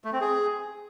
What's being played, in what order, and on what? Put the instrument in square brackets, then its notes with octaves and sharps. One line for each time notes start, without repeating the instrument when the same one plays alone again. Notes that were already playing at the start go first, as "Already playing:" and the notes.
[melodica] A3
C4
G#4